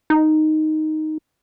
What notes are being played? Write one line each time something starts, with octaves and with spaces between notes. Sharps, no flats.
D#4